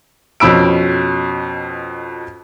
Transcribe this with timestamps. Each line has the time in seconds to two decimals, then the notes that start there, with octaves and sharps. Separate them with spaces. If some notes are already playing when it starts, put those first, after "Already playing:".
0.40 F2 B2 C#4 B5 E6 D7